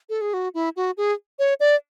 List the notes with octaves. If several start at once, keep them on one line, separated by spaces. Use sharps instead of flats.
A4
G#4
F#4
E4
F#4
G#4
C#5
D5